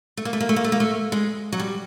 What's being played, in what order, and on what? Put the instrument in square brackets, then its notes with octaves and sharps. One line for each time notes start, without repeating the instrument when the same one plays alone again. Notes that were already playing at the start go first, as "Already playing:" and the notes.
[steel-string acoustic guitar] A3
A#3
A3
A#3
A3
A#3
A3
A#3
A3
G#3
F#3
G3